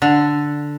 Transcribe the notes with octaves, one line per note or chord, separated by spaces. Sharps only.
D3